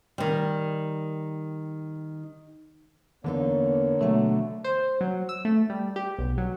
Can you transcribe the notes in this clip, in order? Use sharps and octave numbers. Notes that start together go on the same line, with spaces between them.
D#3 G3
E2 D3 A#3 B3 D#4 C#5
B2 F#3 A3
C5
F#3
E6
A3
G3
G4
B1
F#3